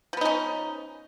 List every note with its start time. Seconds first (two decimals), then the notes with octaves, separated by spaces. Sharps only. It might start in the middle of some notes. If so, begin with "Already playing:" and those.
0.13 F3
0.17 B3
0.21 D#4
0.25 C#4